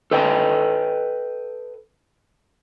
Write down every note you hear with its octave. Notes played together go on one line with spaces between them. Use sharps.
A4 B4 D#5 G5